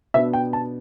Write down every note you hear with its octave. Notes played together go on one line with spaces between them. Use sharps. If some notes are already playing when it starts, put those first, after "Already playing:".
B2 B3 D4 E5
G5
A5